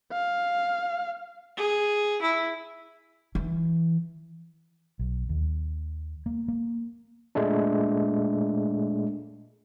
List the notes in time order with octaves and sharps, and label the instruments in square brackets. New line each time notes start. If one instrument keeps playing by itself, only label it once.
[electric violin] F5
[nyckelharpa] G#4
E4
[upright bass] E3
[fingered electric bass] B1
D#2
A#3
A#3
[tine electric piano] A#2 G#3 A3 D4